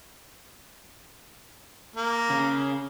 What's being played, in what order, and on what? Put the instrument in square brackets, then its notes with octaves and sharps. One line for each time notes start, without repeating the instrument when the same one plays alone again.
[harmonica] A#3
[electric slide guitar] C#3 C#4